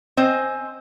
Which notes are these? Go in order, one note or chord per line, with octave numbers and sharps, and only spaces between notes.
C4 C5 D#5 G#5